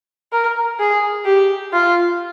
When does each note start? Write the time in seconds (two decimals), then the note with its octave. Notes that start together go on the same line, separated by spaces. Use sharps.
0.32 A#4
0.79 G#4
1.25 G4
1.72 F4